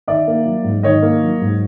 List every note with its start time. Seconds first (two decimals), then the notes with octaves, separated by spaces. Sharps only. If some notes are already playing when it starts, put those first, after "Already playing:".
0.08 D#3 D5 E5
0.27 A#3
0.46 F#3
0.64 G#2
0.83 D#3 C#5 D#5
1.02 A#3
1.22 F#3
1.41 G#2